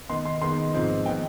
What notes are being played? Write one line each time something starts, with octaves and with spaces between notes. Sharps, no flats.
D#3 B3 D#4 C6
C6
D#3 G#3 B3 C6
G#2 F3 C4 D#4
D#3 B3 D#4 G5